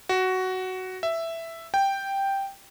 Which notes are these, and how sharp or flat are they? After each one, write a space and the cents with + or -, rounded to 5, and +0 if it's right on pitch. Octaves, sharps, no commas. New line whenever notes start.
F#4 +10
E5 +5
G5 +0